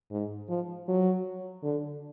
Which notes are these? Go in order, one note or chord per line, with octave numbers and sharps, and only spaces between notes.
G#2
F3
F#3
D3